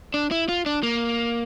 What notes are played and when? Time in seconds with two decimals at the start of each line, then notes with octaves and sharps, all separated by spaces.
0.14 D4
0.31 E4
0.49 F4
0.66 D4
0.83 A#3